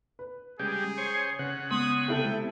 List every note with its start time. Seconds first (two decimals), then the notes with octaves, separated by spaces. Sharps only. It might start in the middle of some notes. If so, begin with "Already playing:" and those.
0.19 B4
0.59 C#3 G3 G#3 G4 G#4
0.98 C5 C#5 G#5
1.39 C#3 C#4 F#5
1.71 G#3 B3 C6 D#6
2.08 C3 E4 A4 G5